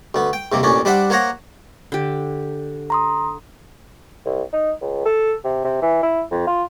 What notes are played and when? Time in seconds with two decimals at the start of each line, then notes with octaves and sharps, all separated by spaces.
0.14 D2 B3
0.33 G5
0.52 D#2 C3 A#3
0.63 A1 A#2 C#4 D4
0.85 G3 D4 C5 E5 F#5
1.10 A#3 C5 C#5 F#5 A#5
1.92 D3 G4
2.90 A#5 C6 D#6
4.26 C2
4.53 D#4
4.81 C#2
5.05 A4
5.44 C3
5.64 C3
5.82 E3
6.03 E4
6.31 F2
6.47 F4